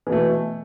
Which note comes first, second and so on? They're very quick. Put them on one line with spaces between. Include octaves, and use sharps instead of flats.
E3 B2 A3